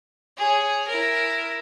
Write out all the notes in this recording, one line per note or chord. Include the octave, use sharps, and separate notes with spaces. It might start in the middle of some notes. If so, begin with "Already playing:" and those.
G#4 C#5
E4 A#4